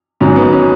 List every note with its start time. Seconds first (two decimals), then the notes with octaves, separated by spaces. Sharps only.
0.20 G#1 G#2 F#3 C#4
0.36 B3
0.53 C#4